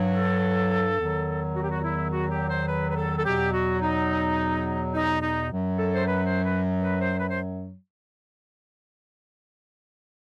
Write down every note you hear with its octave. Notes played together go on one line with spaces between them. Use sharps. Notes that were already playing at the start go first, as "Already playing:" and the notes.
Already playing: G2 F#3
A4
E2 D#3 F#3
F#4
G4
F#4
E4
F#4
G4
C5
B4
B4
A4
A4
E2 B2 F#3 G4
F#4
D#4
D#4
D#4
F#2 F#3
A4
C5
B4
C5
B4
B4
C5
B4
C5